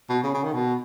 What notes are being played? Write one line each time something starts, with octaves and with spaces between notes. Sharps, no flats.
B2
C#3
C#3
D#3
B2